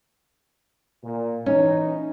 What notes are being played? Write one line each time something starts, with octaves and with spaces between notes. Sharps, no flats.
A#2
E3 C#4 D#4